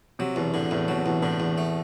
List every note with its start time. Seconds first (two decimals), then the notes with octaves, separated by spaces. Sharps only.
0.19 C3 F#3
0.36 E2 B2
0.53 A2 D3
0.71 E2 A2
0.88 B2 F#3
0.98 C3
1.06 E2 B2
1.22 A2 D3
1.40 E2
1.58 A3